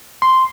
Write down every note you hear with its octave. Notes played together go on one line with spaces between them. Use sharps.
C6